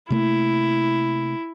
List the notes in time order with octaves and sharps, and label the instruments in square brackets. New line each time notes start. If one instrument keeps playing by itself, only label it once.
[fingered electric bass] C3 A3 A#3 [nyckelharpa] E4